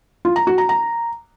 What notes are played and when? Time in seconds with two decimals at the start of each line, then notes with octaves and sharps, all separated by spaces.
0.25 F4
0.36 A#5
0.47 F#4
0.58 A#5
0.69 A#5